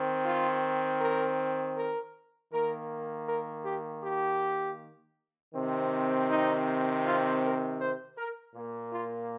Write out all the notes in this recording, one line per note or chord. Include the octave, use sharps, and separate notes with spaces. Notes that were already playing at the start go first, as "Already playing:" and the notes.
Already playing: D#3 C4
F4
A#4
A#4
D#3 A#3 A#4
A#4
G4
G4
C3 D#3 C4
D#4
F4
A#4
C5
A#4
A#2 A#3
F4